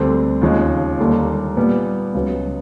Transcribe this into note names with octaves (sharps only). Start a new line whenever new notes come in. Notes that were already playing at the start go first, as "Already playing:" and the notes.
Already playing: D2 D3 G3 C4
D#2 C#3 F3 G#3
D#2 D3 G3 A#3
A#2 G3 B3
C#2 C#3 F#3 B3